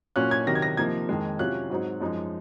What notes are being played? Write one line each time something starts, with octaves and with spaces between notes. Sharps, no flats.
A#2 F#3 C#4 F4 F#6
G#6
C3 D#3 F#3 A#6
G#6
A#6
C3 F3 A#3 D#4 G#6
F2 D#3 G#3
C3 F#3 C#4 F4 F#6
G#2 F#3 C4 D#4
F#2 F3 G#3 D#4